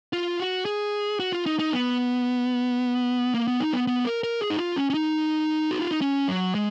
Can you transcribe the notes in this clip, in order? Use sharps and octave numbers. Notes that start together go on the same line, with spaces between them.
F4
F#4
G#4
F#4
F4
D#4
D#4
B3
A#3
B3
D#4
B3
B3
A#4
A#4
G#4
D#4
F4
C#4
C#4
D#4
F#4
F4
D#4
C#4
F#3
G#3